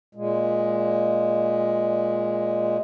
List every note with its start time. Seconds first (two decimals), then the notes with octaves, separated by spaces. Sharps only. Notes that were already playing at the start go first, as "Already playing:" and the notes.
0.15 A#2 G#3